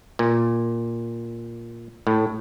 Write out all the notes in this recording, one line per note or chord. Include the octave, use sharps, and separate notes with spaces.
A#2
A2